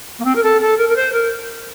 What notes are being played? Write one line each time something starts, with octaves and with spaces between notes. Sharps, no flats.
A#3
C4
A#4
A4
A4
A#4
A#4
C5
A#4